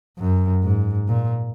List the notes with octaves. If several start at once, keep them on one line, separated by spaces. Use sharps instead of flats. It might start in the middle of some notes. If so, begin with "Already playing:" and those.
F#2
G#2
A#2